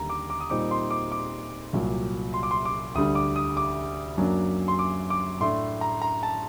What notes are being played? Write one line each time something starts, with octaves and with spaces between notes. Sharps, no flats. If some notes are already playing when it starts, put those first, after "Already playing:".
Already playing: D#2 D3 G3 A#5
D6
D6
D#6
A#2 G3 C4 D#4 D6
C6
D6
D6
C2 A#2 F#3
C6
D6
C6
D6
D2 D3 G3 D4 D#6
D6
D#6
D6
F#2 F#3 A#3 D4
C6
D6
D6
A2 A3 D4 C6
A#5
A#5
A5